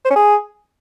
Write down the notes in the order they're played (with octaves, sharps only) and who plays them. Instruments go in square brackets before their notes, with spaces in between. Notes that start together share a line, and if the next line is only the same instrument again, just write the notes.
[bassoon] C5
C#4
G#4